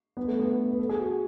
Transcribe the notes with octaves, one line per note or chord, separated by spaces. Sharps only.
B3
A3
B3
B4
A4
G#4
F#4